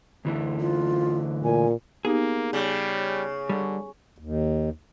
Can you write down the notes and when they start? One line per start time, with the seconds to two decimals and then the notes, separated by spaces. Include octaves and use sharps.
0.25 D2 E3
0.59 F4
1.44 A#2 G#5
2.05 A#3 B3 D#4 G4 G#4
2.53 C#3 G3
3.49 D3 G3
4.18 D#2